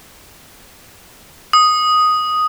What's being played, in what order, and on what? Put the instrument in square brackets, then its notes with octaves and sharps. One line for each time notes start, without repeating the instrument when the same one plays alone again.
[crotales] D#6